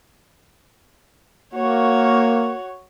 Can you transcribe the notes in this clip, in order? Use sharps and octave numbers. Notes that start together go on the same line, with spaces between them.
A#3 F#4 C#5